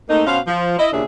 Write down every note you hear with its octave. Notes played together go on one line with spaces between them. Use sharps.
A3 A#3 C4 D#4
B2 C#4 C5 F5
F3
E4 D#5
D#2 A#2 C#3 D4 G#4 E5